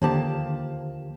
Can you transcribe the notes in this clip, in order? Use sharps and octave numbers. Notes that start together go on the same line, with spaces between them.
D#2 D3 F3 A#3 G4 A5